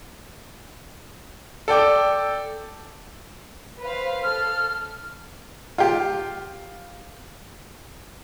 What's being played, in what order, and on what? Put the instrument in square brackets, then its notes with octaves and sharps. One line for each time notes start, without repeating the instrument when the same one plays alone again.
[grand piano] A4 D5 G5 D6
[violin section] B4 C5 F5
[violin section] A4 [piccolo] F6
[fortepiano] F4 G4